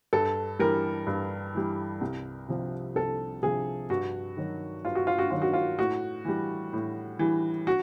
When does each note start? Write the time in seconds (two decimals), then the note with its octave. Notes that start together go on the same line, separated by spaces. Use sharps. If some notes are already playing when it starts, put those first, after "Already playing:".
0.13 G2 A4
0.59 E3 G3 A#4
1.07 G2
1.55 E3 G3
2.01 C2
2.49 C3 F3
2.95 C2 A4
3.42 C3 F3 G#4
3.90 G2 F#4
4.37 D#3 F#3
4.85 G2 F4
4.95 F#4
5.07 F4
5.19 F#4
5.31 D#3 F#3 F4
5.42 F#4
5.53 F4
5.78 A2 F#4
6.25 E3 G3
6.73 A2
7.19 E3 G3
7.67 F#4